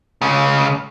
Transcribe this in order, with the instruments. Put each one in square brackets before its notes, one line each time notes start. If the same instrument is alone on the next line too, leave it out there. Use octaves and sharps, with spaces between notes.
[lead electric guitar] C#2 C#3